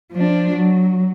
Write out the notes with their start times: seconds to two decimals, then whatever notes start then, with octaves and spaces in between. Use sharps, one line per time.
0.12 F3 D4
0.55 F#3